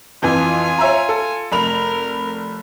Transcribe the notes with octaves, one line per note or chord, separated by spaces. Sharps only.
F2 E3 F4 G#5
C#5 E5 A#5
A4
F1 A#4 B5 F7